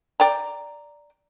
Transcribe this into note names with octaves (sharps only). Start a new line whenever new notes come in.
D5 G5 A#5